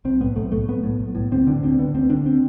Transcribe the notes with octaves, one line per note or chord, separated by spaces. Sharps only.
B1 C4
A2 B3
B1 A3
A2 A3
B1 B3
A2
B1
A2
D2 C4
D3 D4
D2 C4
D3 B3
D2 C4
D3 D4
C4